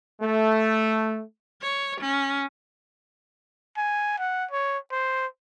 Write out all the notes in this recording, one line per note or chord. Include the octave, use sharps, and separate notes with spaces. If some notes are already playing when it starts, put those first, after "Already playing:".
A3
C#5
C#4
G#5
F#5
C#5
C5